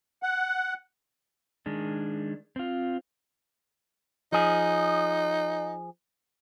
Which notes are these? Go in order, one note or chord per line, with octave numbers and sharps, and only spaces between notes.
F#5
D#3 G#3 D4
C4 F4
F3 D#4 G#4